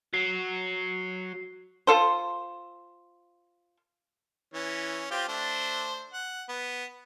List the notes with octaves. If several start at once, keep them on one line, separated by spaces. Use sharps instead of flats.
F#3 C7
F4 A4 C5
E3 C#4
C4 F4 G4
A3 D4 C5
F#5
B3